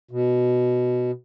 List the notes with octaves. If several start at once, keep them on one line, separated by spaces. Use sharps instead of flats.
B2